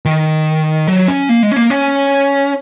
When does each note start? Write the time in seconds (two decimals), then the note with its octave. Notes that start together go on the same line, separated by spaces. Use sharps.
0.05 D#3
0.88 F#3
1.08 C#4
1.29 A#3
1.43 G#3
1.52 C#4
1.56 A#3
1.70 C#4